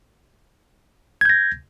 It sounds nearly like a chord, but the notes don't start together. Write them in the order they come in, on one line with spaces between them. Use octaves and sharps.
G#6 G6 A#6